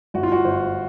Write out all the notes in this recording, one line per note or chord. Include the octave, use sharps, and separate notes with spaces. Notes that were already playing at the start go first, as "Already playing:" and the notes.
G1 F#4
F4
F#4
G1 C5